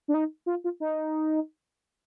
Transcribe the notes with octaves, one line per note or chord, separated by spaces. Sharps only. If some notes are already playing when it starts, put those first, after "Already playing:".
D4
D#4
F4
F4
D#4